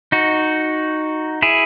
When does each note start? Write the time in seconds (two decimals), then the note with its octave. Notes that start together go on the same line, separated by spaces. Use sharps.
0.12 D#4 F#4
1.42 E4 G#4